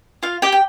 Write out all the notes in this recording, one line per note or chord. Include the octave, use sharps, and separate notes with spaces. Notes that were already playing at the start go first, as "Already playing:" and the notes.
F4 F5
G4 G5
G5